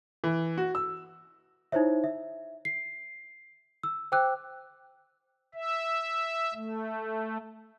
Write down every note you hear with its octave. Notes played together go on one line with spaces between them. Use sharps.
E3
F#4
E6
D#4 E4 C5 C#5 E5
E5
C7
E6
C5 G5 D6 E6 F#6
E5
A3